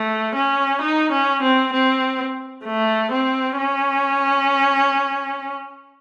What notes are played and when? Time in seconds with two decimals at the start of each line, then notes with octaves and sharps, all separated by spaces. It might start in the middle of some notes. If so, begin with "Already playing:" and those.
Already playing: A3
0.35 C#4
0.81 D#4
1.12 C#4
1.43 C4
1.73 C4
2.65 A3
3.12 C4
3.58 C#4